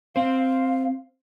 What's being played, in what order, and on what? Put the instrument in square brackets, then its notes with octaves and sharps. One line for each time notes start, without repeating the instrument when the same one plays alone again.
[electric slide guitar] C4 C5 [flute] F5